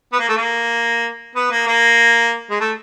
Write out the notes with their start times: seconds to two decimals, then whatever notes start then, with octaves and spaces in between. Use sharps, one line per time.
0.12 B3
0.19 A#3
0.29 A3
0.36 A#3
1.35 B3
1.51 A#3
1.67 A#3
2.50 G#3
2.60 A3